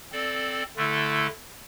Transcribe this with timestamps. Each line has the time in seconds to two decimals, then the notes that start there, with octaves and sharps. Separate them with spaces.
0.12 C4 A4 D5
0.77 D3 A3 E4 A4